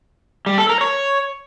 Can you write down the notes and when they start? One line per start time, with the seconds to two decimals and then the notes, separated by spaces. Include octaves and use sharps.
0.46 G3
0.58 A4
0.69 A#4
0.81 C#5